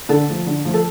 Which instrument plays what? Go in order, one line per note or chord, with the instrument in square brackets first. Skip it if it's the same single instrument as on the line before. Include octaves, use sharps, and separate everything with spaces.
[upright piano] D3 [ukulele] A4
[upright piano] F3 A3
D3
F3 A3
[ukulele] A4